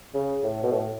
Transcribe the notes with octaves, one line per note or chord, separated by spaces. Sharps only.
C#3
A2
B2
A2